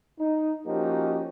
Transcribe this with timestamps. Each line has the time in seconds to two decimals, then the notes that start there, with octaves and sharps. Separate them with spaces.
0.19 D#4
0.67 F3 A#3 C#4 D#4 F#4 G4